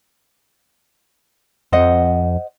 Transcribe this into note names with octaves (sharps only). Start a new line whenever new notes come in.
F2 C5 D#5 F#5